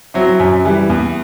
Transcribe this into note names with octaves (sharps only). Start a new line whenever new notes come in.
F#3 C4 E4
F#2
E3 G3
E2